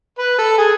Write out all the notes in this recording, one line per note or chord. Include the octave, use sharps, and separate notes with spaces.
B4
A4
G#4